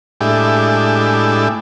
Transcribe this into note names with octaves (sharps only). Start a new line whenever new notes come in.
A2 G#3 D4 E4 G4